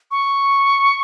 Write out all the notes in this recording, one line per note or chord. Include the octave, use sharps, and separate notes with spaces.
C#6